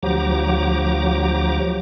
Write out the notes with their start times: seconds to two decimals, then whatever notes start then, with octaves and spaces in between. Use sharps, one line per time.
0.03 D2 F3 F#3 G4 A#5 D6